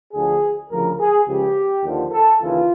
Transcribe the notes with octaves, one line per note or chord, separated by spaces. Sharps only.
D2 D3 F3 G#4
D2 C#3 F3 A#4
G#4
C#2 C#3 F3 G4
D#2 D3 F3
A4
D#2 C#3 E3 F4